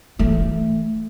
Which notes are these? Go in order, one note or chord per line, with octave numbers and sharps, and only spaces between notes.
E3 A3